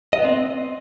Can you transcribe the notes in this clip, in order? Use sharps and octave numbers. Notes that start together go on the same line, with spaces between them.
D#5
B3
C4